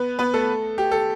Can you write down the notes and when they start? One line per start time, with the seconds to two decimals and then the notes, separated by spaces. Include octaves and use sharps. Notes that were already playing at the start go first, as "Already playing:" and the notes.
Already playing: B3 B4
0.19 B3 B4
0.34 A3 A4
0.78 G4
0.92 A4